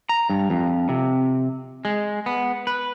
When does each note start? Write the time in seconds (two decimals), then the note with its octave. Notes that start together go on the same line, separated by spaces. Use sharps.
0.09 A#5
0.30 G2
0.50 F2
0.89 C3
1.85 G#3
2.26 B3
2.67 B4